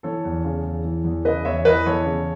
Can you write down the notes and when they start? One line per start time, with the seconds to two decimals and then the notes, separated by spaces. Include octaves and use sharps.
0.03 E3 A4 C#5
0.24 E2
0.45 C#3
0.65 E2
0.84 E3
1.04 E2
1.25 C#3 B4 D#5
1.45 E2 C#5 E5
1.65 E3 B4 D#5
1.86 E2 A4 C#5
2.06 C#3